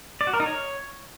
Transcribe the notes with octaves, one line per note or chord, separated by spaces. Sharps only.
D5
F#4
A#4
D#4
C#5